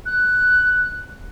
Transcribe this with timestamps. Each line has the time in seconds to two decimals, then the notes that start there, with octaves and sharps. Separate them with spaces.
0.06 F#6